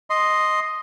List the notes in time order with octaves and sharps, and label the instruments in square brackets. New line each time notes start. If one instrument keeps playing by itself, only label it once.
[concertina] D#5 C6